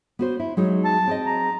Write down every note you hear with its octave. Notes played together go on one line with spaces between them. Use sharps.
B3 F#4 C5
E4
F#3 G#3 D#4
A5
C4 G#4 D#5
A#5